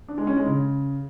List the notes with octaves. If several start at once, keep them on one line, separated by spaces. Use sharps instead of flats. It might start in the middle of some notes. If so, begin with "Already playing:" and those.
D4
G#3
C#4
G#3
C#3